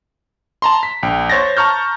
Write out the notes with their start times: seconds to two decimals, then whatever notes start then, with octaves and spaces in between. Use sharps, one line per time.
0.62 A5 A#5 C6
0.83 B6
1.03 A#1 G5
1.30 C5 C#5 A6 A#6
1.57 A5 A#5 C#6 F6 G6